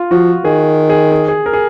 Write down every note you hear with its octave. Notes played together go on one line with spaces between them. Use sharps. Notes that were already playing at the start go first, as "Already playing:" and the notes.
Already playing: F4
F3 F#4
D#3 G#4
G#4
G#4
G#4
A#4
G#4